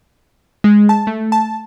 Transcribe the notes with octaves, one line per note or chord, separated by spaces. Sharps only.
G#3
A5
A3
A5